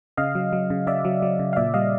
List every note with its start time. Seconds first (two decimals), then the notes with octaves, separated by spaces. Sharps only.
0.17 C#3 D#5 F5
0.35 F#3
0.53 F#3
0.70 C#3
0.87 C#3 D5 E5
1.05 F#3
1.22 F#3
1.39 C#3
1.53 F5
1.56 A#2 D5 E5
1.74 G3 D#5 F5